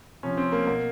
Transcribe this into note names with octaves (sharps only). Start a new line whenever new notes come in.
C3 F3 C#4
C4
A#3
B2 A#3